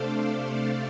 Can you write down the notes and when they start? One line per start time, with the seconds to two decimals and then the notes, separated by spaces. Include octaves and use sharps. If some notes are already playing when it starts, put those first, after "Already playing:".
Already playing: C3 A3 D4 A4 C5 D5 F5
0.19 A4